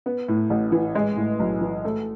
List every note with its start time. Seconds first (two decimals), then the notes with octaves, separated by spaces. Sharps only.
0.06 B3
0.28 A2
0.50 A1
0.72 E3
0.95 G#3
1.17 A2
1.40 B1
1.61 E3
1.85 A3